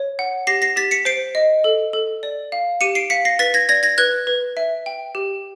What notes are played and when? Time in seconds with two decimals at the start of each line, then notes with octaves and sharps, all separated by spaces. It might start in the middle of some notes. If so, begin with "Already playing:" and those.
Already playing: C#5
0.19 F#5
0.47 G4 A#6 C7
0.62 A#6 C7
0.76 G4 A6 B6
0.91 B6 C#7
1.05 C5 C7 D7
1.35 D#5
1.64 A4
1.93 A4
2.23 D5
2.52 F5
2.81 G4 C#7 D#7
2.95 C7 D7
3.10 F5 B6 C#7
3.25 A#6 C7
3.39 B4 A6 B6
3.54 G#6 A#6
3.69 D5 G#6 A#6
3.83 G#6 A#6
3.98 B4 F#6 G#6
4.27 B4
4.57 E5
4.86 G5
5.15 G4